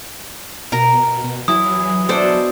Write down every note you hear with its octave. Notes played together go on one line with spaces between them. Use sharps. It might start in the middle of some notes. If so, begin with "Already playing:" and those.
B2 A#4 A#5
B2
E3 F#3 E4 D#6
G#4
B2 D4 E4 A4 C5 D5